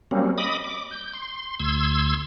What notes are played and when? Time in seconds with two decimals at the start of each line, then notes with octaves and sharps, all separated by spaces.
0.11 F#3 G3 A#3 C4 C#4
0.38 D#5 B5 D6 D#6
0.64 D6
0.91 G6
1.14 C6
1.60 D2 C6 E6 G#6